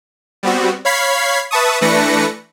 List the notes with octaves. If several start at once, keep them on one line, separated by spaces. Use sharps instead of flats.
G3 B3 C4 F#4
C#5 F5 B5 G#6 B6 C7
B4 E5 A5 C#6 D#6
E3 A3 D4 B4 A#6 C#7